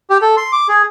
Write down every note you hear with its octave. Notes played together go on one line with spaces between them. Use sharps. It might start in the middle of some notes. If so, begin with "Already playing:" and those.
G4
A4
C6
D6
G#4